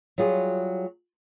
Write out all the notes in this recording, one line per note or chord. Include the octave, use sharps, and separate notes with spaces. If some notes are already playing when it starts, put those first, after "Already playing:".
F#3 G3 F4 G#4